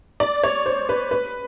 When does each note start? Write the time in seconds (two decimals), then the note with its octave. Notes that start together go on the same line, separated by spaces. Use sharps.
0.20 D5
0.44 C#5
0.66 C5
0.89 B4
1.11 B4